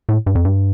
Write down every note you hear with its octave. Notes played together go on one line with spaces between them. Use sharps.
A2
G2
F2
G2